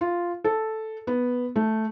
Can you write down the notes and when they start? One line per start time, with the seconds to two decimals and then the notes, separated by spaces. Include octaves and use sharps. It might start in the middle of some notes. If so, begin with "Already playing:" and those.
0.01 F4
0.44 A4
1.07 B3
1.56 A3